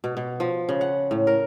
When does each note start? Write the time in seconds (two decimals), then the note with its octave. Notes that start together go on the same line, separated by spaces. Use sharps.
0.04 B2
0.17 B2
0.40 F3
0.69 C#3
0.81 F#5
1.11 A2
1.27 A#4